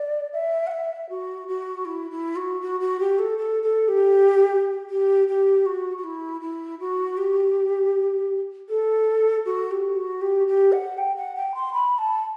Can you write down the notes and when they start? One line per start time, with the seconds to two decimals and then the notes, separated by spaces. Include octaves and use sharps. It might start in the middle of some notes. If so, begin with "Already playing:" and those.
Already playing: D5
0.33 E5
0.67 F#5
0.71 E5
1.09 F#4
1.48 F#4
1.85 E4
2.11 E4
2.36 F#4
2.61 F#4
2.80 F#4
2.99 G4
3.19 A4
3.38 A4
3.62 A4
3.88 G4
4.90 G4
5.28 G4
5.66 F#4
5.97 F#4
6.04 E4
6.41 E4
6.80 F#4
7.17 G4
8.69 A4
9.45 F#4
9.71 G4
9.96 F#4
10.21 G4
10.47 G4
10.72 F#5
10.98 G5
11.16 F#5
11.35 G5
11.55 C6
11.73 B5
11.98 A5